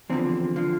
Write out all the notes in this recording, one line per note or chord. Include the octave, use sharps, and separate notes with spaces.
E2 D3 F3 C4
D3 F3